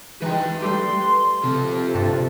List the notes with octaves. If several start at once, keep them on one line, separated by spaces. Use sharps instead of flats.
E3 G#3 D#4 B4 G5
G3 A3 G4 C6
C3 C4 F4 A4
G1 G2 A5